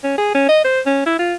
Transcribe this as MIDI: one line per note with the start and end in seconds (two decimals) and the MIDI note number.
0.03 0.15 61
0.18 0.31 68
0.34 0.45 61
0.49 0.60 75
0.64 0.80 72
0.86 1.01 61
1.06 1.18 64
1.19 1.34 65